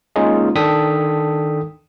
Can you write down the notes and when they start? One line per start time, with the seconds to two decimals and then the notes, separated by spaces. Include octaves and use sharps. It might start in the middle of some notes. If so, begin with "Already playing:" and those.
0.16 G#3 A#3 C#4 D#4 F4 G#4
0.55 D#3 D4 A4 G5 D#6 B6